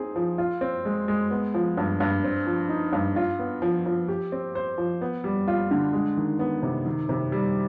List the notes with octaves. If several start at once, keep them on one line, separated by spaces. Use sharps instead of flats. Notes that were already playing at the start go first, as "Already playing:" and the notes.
Already playing: C4 D#4 G#4
F3
F4
C4
G#3
G#3
B3
F3
G2
G2
C4
F3
D#4
G2
F4
B3
F3
F3
G4
C4
C5
F3
B3
G3
F4
D3
G#3
D#3
B3
C3
D#3
C3
G3